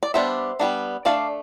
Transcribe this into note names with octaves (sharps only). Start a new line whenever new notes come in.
D5
G3 B3 D4 C5 E5
G3 B3 D4
A3 D4 D5 F5